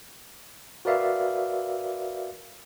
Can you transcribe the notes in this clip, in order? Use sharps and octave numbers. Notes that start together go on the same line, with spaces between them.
F#4 A#4 B4 D5 E5 F5